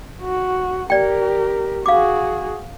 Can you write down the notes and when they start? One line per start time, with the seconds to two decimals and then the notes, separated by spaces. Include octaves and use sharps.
0.22 F#4
0.90 G4 A#4 D5 G5
1.86 F#4 G#4 F5 D6